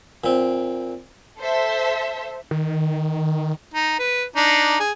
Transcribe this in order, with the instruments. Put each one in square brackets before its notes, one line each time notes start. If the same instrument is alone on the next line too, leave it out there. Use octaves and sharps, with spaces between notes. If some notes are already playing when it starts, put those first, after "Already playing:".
[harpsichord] A#2 C4
[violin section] A4 C5 E5
[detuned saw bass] D#3
[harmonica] D#4
B4
D4 D#4
G#4